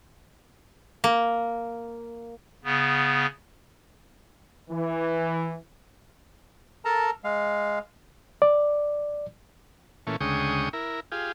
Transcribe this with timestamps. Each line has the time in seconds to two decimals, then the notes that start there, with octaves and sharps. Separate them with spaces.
1.04 A#3
2.64 C#3 B3
4.70 E3
6.85 A4 A#4 A5 A#5
7.24 G#3 F5
8.42 D5
10.07 A#2 E3 A3 C#4
10.21 D2 C#3 G#3 G5 C#6 D#6
10.73 E4 A#4
11.12 F4 G4 G#4